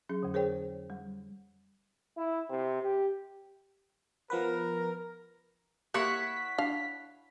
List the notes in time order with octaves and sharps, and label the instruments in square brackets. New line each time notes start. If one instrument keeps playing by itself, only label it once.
[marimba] F#3 C#4 G#4
F2 D3
G#4 A#4 C5 C#5 G5
G3
[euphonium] E4
C3
G4
[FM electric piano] F3 B3 B4 [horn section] A#4
[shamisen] A#3 [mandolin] E4 C#5 F#5 [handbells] G4 C6 C#7 [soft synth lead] B6
[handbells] D4 [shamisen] F5